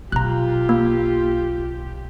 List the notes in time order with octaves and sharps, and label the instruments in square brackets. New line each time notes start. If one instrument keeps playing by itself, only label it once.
[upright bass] B1 [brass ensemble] F4 [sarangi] G4 [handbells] A#5 F#6
[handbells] A#3